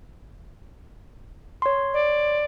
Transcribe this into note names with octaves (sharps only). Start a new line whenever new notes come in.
C#5 C6
D5